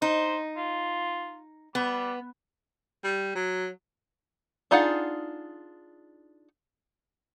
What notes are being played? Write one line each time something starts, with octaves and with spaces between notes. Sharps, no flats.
D#4 C5
F4
G3 B3
G3
F#3
D4 D#4 F4 G#4 F#5